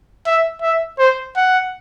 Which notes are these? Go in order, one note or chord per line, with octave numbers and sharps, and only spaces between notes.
E5
E5
C5
F#5